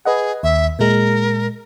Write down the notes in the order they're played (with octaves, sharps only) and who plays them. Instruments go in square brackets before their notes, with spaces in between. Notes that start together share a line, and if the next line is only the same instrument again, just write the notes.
[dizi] G#4 [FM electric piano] B4 D#5 F#5
[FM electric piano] D#2 [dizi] E5
[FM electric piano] A#2 G#3 [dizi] A#4